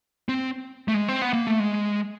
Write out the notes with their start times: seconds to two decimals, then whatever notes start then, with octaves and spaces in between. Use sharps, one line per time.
0.29 C4
0.88 A3
0.94 G#3
1.08 C4
1.22 B3
1.33 A#3
1.47 A3
1.59 G#3